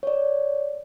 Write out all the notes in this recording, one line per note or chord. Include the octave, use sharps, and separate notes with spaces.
C#5 D5